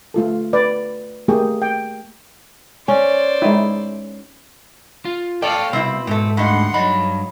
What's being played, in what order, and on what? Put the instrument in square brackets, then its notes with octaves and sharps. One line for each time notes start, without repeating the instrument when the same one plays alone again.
[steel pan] A3 F4 A4
B4 D5
A3 A#3 G4 G#4
G5
[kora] C#4 [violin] C5 D5
[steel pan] G#3 D#4 E4
[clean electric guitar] F4
[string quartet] A4 F5 [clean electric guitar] C#5 G5 [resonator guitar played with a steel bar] D5
[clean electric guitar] C2 [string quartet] B2 [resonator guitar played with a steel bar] C4 E4
[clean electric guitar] G#2 [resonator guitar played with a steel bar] A3 C4
[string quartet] D2 F#5 C6 [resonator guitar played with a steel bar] G2 D#4
[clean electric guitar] G2 B5 [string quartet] F#3 [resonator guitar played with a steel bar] D#4